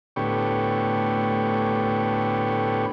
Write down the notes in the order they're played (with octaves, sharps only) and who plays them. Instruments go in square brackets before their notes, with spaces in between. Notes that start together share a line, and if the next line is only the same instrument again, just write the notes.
[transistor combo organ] D2 A2 B3 G4 C#5